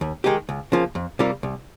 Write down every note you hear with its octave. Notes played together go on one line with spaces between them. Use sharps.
D#2
D#3 G#3 D#4 G4
C#2
C#3 F3 A#3
F2
C3 G3 A#3 F4
C2